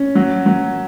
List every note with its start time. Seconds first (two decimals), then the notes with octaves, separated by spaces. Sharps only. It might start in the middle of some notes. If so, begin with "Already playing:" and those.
Already playing: C#4
0.15 F#3
0.46 F#3